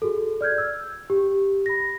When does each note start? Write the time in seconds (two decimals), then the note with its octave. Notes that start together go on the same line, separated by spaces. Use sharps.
0.02 F#4 G#4 A4
0.41 D5 F6 G6 G#6
0.58 E6
1.10 G4
1.66 B5 A#6